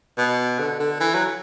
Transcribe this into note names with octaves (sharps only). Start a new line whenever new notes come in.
B2
D3
D3
E3
F#3